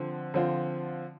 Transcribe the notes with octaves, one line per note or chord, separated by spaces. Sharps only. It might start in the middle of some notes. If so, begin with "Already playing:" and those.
Already playing: D3 F3 C4
D3 F3 C4 F4